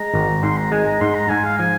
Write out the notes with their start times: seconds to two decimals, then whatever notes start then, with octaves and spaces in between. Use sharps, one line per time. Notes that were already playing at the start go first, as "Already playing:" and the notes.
Already playing: G#3 A#5
0.14 G#1
0.43 G#2 C6
0.57 A#5
0.72 G#3 G#5
0.86 A#5
1.01 G#2 C6
1.15 A#5
1.29 G#2 G#5
1.44 F5
1.58 F3 G#5